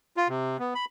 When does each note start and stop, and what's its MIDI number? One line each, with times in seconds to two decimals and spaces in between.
0.17 0.28 65
0.29 0.57 48
0.59 0.74 59
0.75 0.85 83